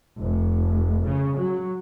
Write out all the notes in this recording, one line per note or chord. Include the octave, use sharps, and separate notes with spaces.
F1
C#3
F#3